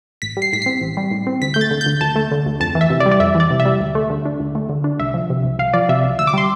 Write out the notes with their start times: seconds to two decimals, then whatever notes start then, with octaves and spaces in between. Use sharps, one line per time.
0.22 A1 B6
0.37 G3
0.42 C7
0.53 A2 B6
0.62 C4 C7
0.81 A1
0.97 G3
1.11 A2
1.27 C4
1.42 D2 B6
1.54 A3 G6
1.61 A6
1.71 D3
1.81 G6
1.86 D2
2.01 D2 A5
2.16 A3
2.31 D3
2.46 D2
2.60 F2 A5
2.75 E3
2.81 E5
2.90 C3
3.00 D5
3.06 G3
3.12 D5
3.20 F2 E5
3.35 E3
3.40 D5
3.51 C3
3.60 E5
3.65 G3
3.81 D2
3.95 A3
4.10 D3
4.25 D4
4.40 D2
4.55 A3
4.69 D3
4.84 D4
4.99 C2 E5
5.14 F3
5.30 C3
5.44 C2
5.59 C2 F5
5.74 F3 D5
5.89 C3 E5
6.04 C2
6.19 D2 E6
6.27 D6
6.33 G3 C6